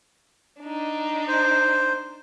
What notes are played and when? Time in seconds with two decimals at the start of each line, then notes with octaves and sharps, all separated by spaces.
0.62 D4 D#4
1.28 C5